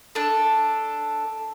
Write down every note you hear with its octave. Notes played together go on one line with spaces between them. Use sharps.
D4 A4